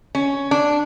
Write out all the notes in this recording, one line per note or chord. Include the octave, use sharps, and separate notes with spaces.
C#4
D4